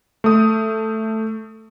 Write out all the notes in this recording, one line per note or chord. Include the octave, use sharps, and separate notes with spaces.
A3 D#6